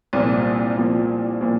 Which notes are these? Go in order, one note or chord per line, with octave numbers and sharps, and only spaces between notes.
C2 A#2 F3 A#3 D5
C2 A#2 F3 A#3
A#2 F3 A#3